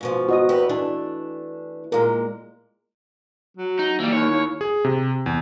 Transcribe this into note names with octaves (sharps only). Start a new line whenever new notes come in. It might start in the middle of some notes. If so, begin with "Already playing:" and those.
G#2 B2 F3
F#4 D#5 D#6
E2 G4 B4
E3 A3 D4
A#2 G#3 A#4
F#3
D#4
E3 G3 A#3
D#2 C#5
D#2 E4
G#4
C3
E2